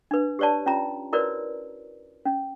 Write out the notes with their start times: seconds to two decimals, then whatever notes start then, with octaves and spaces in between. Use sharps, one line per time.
0.11 D4 B4
0.39 G4 B4 C#5 D5 A5
0.66 C#4 F4 A#5
1.13 E4 F#4 A#4 B4 C#5 D5
2.26 C#4